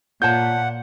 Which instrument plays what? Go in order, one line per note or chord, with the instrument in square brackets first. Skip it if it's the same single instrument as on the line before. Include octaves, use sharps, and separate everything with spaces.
[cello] A#2 [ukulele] F4 C#5 A5 [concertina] F#5 [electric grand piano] G6